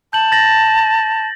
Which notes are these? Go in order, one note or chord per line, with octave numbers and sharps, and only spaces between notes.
A5 G6 F#7
A6 A#6 F#7